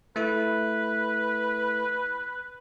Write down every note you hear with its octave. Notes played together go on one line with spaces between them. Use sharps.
A3 E4 B4